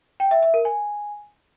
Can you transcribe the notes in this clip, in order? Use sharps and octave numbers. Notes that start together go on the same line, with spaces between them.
G5
E5
E5
A#4
G#5